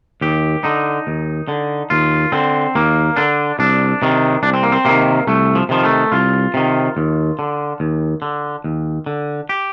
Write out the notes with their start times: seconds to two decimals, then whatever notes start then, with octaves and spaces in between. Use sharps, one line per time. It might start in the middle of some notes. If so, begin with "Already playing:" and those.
0.21 D#2 G4
0.64 D3 D#4
1.07 D#2
1.48 D3
1.90 D#2 F4
2.32 D3 C4
2.75 D#2 A#3
3.16 D3 D4
3.59 C2 D4
4.02 C3 D#3
4.43 C2 D4
4.53 C4
4.63 A#3
4.72 C4
4.85 C3 D#3 A#3
5.27 C2 A3
5.55 F3
5.69 C3 D#3 F3
5.84 A3
6.12 C2 F4
6.54 C3 D#3
6.97 D#2
7.39 D3
7.80 D#2
8.22 D3
8.64 D#2
9.06 D3
9.49 G4